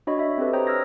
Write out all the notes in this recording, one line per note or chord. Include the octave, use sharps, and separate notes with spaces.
D4 F#4 C#5 D#5 B5
D#5 E5
C4 G4 A4 B4
C5 C#5 G5 A#5 D#6 G6
E6 F6 G#6 A#6